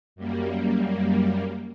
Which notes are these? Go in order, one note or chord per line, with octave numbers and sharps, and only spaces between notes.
F#2 G3 A#3